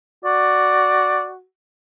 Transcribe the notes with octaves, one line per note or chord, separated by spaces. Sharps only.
F#4 D5